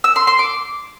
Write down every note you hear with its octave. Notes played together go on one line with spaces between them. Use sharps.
E6
C6
C6
D6